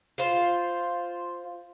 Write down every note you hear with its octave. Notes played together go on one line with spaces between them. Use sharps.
F4 C5